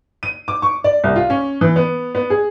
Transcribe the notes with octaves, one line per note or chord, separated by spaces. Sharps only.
D#7
D6
C#6
D5
C2
F4
C#4
E3
B3
B3
G#4